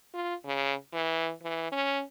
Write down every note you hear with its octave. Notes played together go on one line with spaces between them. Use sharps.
F4
C#3
E3
E3
C#4